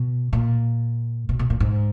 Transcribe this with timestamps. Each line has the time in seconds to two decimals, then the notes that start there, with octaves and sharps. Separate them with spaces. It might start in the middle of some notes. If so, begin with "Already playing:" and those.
Already playing: B2
0.33 A#2
1.29 B2
1.39 B2
1.50 A#2
1.60 G#2